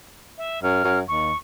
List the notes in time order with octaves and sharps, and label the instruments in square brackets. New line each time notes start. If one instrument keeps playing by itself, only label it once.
[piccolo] E5
[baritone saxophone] F#2 [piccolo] F6
[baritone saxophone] F#2
[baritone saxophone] D#2 [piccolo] C#6